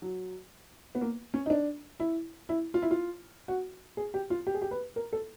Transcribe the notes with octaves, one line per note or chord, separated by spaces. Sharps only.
F#3
B3
A#3
C#4
D#4
D4
E4
E4
F4
E4
F4
F#4
G#4
G4
F4
G4
G#4
G4
B4
A#4
A4